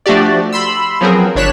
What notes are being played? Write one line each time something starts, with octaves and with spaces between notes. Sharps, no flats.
F3 A3 D4 F#4 G4 D5
B5 C6 E6
F3 F#3 B3 C4 G#4 A#4
G1 D4 C#5 F#6 B6 E7